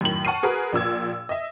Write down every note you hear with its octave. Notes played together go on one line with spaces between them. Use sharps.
F#2 A2 D#3 F#7
F#5 A5 C#6 F6 C7 D#7
F#4 G#4 A#4 B4
A#1 A#2 E6 G#6
D#5 E5